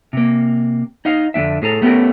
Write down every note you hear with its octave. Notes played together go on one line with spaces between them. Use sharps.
C3 A#3
D#4 D#5 F5
F2 D3 G3 D4 E5
A2 G#4 A4 A#5
A3 B3 C#4 G4 A#4